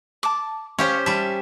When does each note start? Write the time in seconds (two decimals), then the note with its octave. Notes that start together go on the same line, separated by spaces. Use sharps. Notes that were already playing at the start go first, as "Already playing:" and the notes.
0.23 A5 D6
0.79 C#4 G4 C5 C#5 F5
1.06 G3 E5 A5